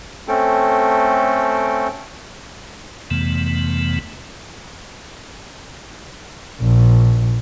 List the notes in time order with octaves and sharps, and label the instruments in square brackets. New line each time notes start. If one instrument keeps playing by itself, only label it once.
[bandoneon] A3 C4 C#4 A4 G5
[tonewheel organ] F2 C3 E3 A3 B3
[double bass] A#1